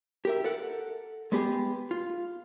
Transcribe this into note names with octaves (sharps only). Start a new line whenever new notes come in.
G4 A#4 E5
A4 A#4 F#5
G#3 B3 G4 G#4
F4